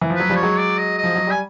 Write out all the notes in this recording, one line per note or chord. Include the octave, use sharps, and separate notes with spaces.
E3
F3
F#3 B4
F3 G3
C#5
F#3 G#3
D5
D#5
D#5
F3
F#3
G3 G#5